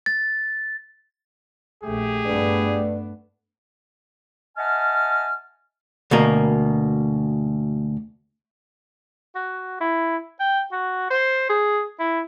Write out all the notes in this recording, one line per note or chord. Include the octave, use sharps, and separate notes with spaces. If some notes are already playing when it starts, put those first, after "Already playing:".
A6
A#1 A3 G4 G#4
G2 A3 B3 D4 B4 D5
D#5 E5 F#5 G#5 A5 F6
D2 B2 A#3 A#4
F#4
E4
G5
F#4
C5
G#4
E4